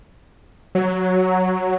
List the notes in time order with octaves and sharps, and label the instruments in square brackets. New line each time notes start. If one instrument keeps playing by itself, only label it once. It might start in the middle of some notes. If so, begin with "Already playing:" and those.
[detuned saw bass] F#3